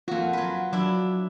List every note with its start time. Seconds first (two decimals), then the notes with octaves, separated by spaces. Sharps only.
0.08 F2 A#3 F4 F#4
0.33 F#3 B4
0.73 F#3 D4 E4